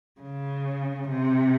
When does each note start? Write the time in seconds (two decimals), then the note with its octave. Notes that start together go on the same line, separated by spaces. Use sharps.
0.20 C#3
1.10 C3